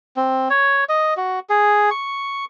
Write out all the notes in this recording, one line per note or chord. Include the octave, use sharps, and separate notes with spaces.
C4
C#5
D#5
F#4
G#4
C#6